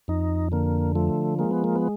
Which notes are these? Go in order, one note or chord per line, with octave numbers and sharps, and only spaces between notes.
F2 D#4
D3 A#3
F3 A3
G#3 A#3
B3
A#3
B3